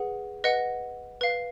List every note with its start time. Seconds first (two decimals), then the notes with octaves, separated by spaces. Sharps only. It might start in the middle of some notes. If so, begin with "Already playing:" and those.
Already playing: G#4 B4 F#5
0.44 B4 D#5 F#5
1.21 B4 F5